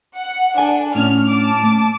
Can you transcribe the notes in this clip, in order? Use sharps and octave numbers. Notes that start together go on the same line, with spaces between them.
F#5
D4 A4 G#5
A2 C#4 F6
A5 D6
A3